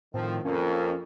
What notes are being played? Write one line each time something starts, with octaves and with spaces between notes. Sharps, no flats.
A2 D#3 F3 C4
F2 A#3 C#4